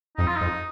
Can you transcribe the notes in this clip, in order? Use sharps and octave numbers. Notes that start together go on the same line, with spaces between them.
F2 D#4
F4
D#4
F2